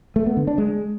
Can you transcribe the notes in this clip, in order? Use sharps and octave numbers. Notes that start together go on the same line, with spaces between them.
A3
B3
D3
D4
G#3